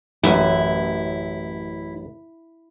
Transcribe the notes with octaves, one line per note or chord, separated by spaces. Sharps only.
A1 F#2 E4